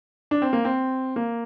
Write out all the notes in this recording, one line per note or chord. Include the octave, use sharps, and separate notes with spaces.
D4
C4
A#3
C4
A#3